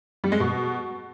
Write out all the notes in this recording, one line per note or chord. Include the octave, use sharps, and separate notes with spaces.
G3
G#3
B2